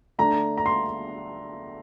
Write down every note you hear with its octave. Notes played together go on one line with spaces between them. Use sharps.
D3 A3 D4 A#5
A#5
C6